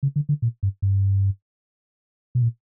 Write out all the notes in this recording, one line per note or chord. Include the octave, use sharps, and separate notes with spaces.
C#3
D3
D3
A#2
G2
G2
B2
A#2